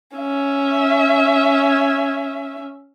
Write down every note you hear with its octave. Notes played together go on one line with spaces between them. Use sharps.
C#4 E5